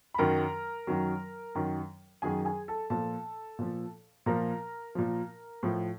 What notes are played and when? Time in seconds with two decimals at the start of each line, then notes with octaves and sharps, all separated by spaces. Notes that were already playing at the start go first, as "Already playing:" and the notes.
0.14 B5
0.18 F#2 D#3 F#3 A#4 A#5
0.87 F#2 D#3 F#3
1.55 F#2 D#3 F#3
2.22 F#2 D#3 F#3 G#4 G#5
2.45 G#4 G#5
2.68 A4 A5
2.90 A#2 F3 A4 A5
3.59 A#2 F3
4.26 A#2 F3 A#4 A#5
4.95 A#2 F3
5.63 A2 F3